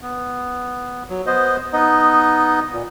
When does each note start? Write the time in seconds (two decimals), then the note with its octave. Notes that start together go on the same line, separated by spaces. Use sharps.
0.01 B3
1.10 F#3
1.26 B3 C5 D#5
1.73 B3 D#4 D#5
2.73 A#2